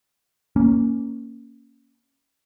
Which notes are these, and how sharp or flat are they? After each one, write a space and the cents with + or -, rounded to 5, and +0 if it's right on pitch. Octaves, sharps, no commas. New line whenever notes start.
A#3 -5 C#4 +0